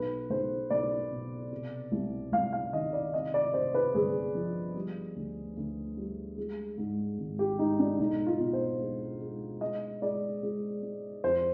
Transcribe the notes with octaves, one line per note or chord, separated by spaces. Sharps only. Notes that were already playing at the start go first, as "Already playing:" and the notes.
Already playing: B1 B4
B1 C5
B1 D5
B2
C3
C2
C2 F5
F5
D#3 D#5
D5
C3 D#5
D5
C3 C5
B4
G1 G#4
F3
G3
D2
D2
G3
G#3
G#2
G#1
G4
G#2 D#4
D4
B1 D#4
F4
B2
C5
G#3
G#3
G#3 D#5
G#3 D5
G#3
G#3
F2 C5